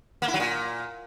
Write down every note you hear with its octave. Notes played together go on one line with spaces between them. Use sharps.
A#3
E4
F#3
A#2